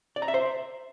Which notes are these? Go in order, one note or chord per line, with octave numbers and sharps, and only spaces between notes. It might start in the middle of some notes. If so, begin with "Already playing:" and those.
D5
A#5
E5
C5